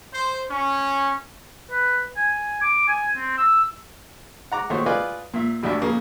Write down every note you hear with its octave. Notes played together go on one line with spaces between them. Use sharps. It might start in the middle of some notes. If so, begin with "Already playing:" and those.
C5
C#4
B4
G#5
D6
G#5
C4
E6
F#5 A#5 D6
A#2 D#3 A3 F#4 C5 C#5
F4 B4 D5 D#5 F5 G#5
A#2 E5
A1 D2 A2 D4 E5
F2 A#2 C#3 A#3